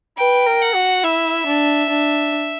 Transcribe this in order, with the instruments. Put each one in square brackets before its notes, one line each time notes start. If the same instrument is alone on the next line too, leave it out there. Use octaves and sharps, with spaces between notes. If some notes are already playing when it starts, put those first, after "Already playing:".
[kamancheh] B4 [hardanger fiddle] G5
[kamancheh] A#4
[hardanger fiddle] F#5
[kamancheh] F#4
[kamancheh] E4 [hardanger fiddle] E5
[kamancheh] D4
D4